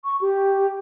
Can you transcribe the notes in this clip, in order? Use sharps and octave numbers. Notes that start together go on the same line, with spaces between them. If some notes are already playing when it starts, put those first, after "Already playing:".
C#6
G4